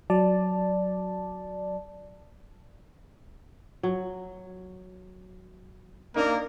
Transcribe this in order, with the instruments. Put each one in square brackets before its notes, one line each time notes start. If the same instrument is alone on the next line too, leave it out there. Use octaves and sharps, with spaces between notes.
[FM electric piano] F#3 D5 A5
[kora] F#3
[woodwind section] A#3 [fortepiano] D4 D#4 [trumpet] A#4